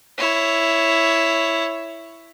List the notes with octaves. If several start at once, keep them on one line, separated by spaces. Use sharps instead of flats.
E4 C#5